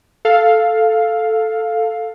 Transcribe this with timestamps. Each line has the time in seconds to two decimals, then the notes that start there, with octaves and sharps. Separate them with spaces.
0.25 A4 F5